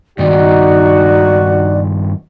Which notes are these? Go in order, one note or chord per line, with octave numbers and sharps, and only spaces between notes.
G2 D#3 D#4 F#4 D5